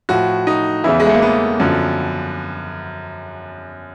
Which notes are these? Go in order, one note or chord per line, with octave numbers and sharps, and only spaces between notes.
A2 F3 F#4
D#4
E2 C#3 E3 E4
G#3
A3
A#3
B3
F#2 D3 F3